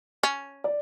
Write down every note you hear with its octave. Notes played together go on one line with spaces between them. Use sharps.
C#4
D5